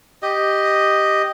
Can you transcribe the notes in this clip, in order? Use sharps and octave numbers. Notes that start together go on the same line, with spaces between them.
G4 D#5